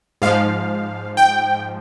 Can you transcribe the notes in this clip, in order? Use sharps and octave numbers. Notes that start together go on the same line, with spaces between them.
G#2 F3 F5
G5